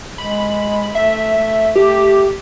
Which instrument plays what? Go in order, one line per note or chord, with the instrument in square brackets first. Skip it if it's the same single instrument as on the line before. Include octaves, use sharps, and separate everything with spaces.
[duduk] G#3 [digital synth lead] B5
[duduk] A3 [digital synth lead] E5
[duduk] A3
[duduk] A3 [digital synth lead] G4